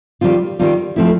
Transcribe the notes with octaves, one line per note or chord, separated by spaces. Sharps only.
D#3 G3 C4 F4
D#3 G3 C4 F4
F3 A3 C4 E4